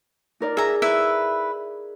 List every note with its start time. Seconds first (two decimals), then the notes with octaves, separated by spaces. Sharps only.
0.40 D#4 A#4 D5
0.57 G#4 E5 A#5
0.82 E4 B4 E5